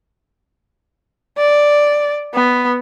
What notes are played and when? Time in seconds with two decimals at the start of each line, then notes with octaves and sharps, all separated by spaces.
1.37 D5
2.34 B3